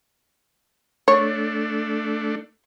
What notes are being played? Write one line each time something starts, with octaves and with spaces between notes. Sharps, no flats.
A3 D4 C#5